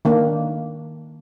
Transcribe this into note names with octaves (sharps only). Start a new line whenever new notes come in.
D#3 A#3 D4